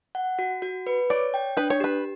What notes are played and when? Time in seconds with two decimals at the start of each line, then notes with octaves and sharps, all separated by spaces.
0.15 F#5
0.39 F#4
0.62 F#4
0.87 B4
1.10 C#5 D5
1.34 G5
1.57 D4 B4
1.70 C#5
1.80 G4 B4